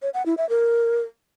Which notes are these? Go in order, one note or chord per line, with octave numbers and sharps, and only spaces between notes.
C#5
F#5
E4
E5
A#4